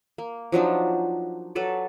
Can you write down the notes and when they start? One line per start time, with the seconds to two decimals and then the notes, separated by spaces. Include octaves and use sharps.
0.18 A#3
0.52 F3 F#3 D4 D#4
1.55 F#3 A4 B4 D5